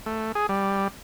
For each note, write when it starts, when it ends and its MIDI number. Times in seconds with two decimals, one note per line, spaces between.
0.06 0.32 57
0.35 0.47 68
0.49 0.88 55